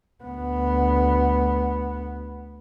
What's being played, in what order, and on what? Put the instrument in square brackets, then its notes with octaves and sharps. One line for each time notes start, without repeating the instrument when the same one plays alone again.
[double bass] D2 B3